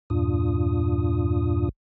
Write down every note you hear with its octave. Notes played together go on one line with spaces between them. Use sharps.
E2 G2 A#2 D4 F4 D#6